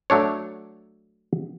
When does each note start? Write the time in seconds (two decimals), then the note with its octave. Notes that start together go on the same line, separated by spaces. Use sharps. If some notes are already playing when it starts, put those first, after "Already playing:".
0.10 F#3 A3 D4 C#5